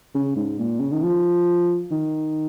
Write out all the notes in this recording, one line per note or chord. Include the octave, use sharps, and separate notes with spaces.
C#3
G#2
A#2
C#3
D#3
F3
D#3